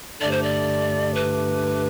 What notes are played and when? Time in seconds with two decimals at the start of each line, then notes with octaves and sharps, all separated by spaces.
0.21 G2 D3 A3 D4 G4 D5
0.31 C5
0.42 D5
1.14 B4